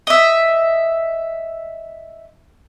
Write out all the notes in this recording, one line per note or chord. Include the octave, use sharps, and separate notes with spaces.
D#5 E5